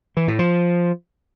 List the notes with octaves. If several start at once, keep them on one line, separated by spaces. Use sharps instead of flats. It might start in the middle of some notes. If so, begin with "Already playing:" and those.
E3
A2
F3